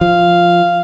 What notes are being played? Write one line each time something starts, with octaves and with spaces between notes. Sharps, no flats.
F3 F5